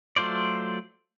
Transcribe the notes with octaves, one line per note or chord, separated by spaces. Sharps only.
F#3 A3 F4 C5 D5